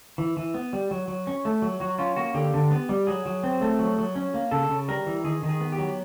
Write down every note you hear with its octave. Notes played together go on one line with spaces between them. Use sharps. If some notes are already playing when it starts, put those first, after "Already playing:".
E3
E3
B3
G3
F#3
F#3
C#4
A3
F#3
F#3 F#4
C#4 F4
A#3 F#4
D3 G4
D3
B3
G3
F#3 G#4
F#3
C4
A3
F#3
F#3
C#4
A#3
C#3 A4
C#3
G3 A#4
E3
D#3 G#4
D#3
G#4
B3
G4
F#3